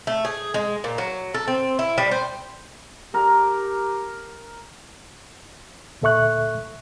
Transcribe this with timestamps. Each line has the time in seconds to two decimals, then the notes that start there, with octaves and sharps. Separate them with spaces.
0.07 A3
0.25 G#4
0.54 G#3
0.84 A#2
0.98 F#3
1.34 A4
1.48 C4
1.79 E4
1.98 G3
2.11 C5
3.14 G4 A#4
6.02 D2 A#2 A4 E5 C#6 F#6